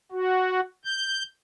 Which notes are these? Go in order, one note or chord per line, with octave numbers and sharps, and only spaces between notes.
F#4
G6